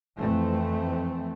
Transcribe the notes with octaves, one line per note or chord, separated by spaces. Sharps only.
F2 E3 A3 C4